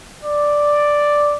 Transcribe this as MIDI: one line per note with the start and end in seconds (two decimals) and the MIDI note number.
0.23 1.38 74